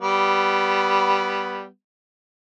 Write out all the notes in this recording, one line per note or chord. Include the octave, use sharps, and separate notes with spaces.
G3 B3